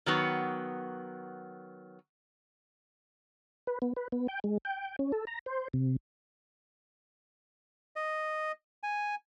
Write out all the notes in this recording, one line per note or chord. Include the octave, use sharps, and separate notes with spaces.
D#3 F#3 B3
B4
B3
B4
B3
G5
G#3
G5
C#4
A4
A#5
C5
C3
D#5
G#5